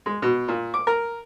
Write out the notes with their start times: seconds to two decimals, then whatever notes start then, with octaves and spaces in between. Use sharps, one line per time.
0.06 G#3
0.22 B2
0.48 A#2
0.74 D6
0.87 A#4